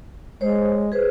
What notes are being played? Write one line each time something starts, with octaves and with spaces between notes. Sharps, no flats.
G#3 C5 C#5
G#4 B4 C5